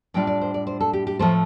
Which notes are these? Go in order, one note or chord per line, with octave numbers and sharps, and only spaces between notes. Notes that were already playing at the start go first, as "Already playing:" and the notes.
A2 G3 D4 F4 G5
D5
C5
D5
C5
A4
G4
G4
A2 F3 A3 C5